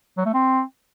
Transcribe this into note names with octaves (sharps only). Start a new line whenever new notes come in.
F#3
A3
C4